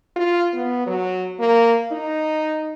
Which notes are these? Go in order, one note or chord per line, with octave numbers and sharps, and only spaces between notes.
F4
B3
F#3
A#3
D#4